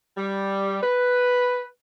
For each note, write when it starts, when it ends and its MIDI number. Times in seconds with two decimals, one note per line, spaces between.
0.17 0.79 55
0.83 1.66 71